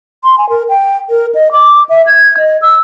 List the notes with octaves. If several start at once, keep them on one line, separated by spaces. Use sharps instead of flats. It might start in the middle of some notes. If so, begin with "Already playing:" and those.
C6
G#5
A#4
G5
A#4
D#5
D6
E5
G#6
D#5
E6